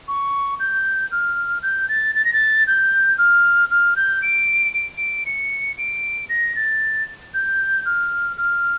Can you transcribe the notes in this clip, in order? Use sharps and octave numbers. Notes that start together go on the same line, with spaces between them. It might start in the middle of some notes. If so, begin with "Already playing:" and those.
C#6
G6
F6
G6
A6
A6
A#6
A6
G6
F6
F6
G6
D7
D7
D7
C#7
D7
A#6
A6
G6
F6
F6